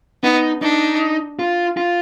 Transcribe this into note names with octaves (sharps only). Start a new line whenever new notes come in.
B3 D#4
D4 D#4
F4
F4